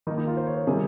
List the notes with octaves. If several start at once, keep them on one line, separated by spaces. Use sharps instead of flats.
D#3 A#3 D#4
D#4
F4
C5
C#5
C5
C3 D#3 G3 G#4